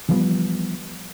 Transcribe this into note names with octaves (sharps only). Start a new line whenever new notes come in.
E3 F3 G3 B3